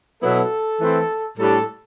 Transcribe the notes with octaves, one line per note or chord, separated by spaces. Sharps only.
B2 F#3 B3 E4 A4
E3 A3 C4 E4
A2 G3 D4 A4